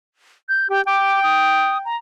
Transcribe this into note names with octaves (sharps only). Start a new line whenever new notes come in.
G6
G4 G5
G5 D6
D#6
A#5